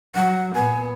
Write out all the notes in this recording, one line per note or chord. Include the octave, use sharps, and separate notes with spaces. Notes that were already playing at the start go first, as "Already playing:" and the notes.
F#3 F#5
A#2 B3 G#5